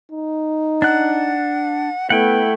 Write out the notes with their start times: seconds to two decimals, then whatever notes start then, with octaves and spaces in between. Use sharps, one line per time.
0.11 D#4
0.82 D4 F#5 F#6
2.10 A3 B3 E4 F#5 G5